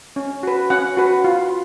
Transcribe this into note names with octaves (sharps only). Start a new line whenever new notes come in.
C#4
F#4 B4
C#4 F#5
F#4 B4
F4